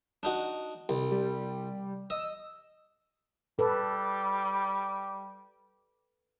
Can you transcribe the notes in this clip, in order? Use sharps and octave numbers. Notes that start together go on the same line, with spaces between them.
D4 D#4 F#4
C2
G3
D#5 E6
G3 A4 B4